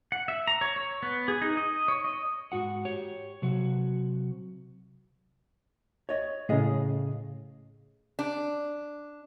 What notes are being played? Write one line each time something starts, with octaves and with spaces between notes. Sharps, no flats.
F#5
E5
A#5
C#5
C#5
B3
G#4
D#4
D#5
C#5
D#5
G#2 F#4 F#5
G4 C#5
C3 F#3 F#4
C#5 D#5
A2 C#3 G#4 D#5 F5
D4